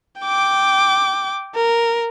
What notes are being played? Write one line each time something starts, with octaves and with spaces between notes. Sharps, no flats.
G5 D6
A#4